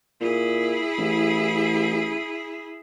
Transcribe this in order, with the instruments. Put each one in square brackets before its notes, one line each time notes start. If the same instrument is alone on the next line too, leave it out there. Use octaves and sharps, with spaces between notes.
[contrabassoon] A#2 [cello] E4 G#4
[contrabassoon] A1